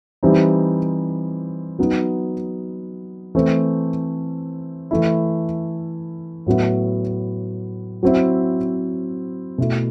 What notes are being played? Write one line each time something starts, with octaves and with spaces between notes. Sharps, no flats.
E3 G3 C4 D#4
F#3 B3 D#4
E3 A3 C4
E3 A3 E4
A2 F#3 B3 E4
F#3 C4 E4
B2 A3 E4